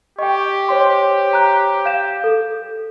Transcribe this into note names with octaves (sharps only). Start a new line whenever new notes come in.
G4 D#5 G5 C#6
C5 C#5 C6
A#5 F#6
F5 G6 E7
A4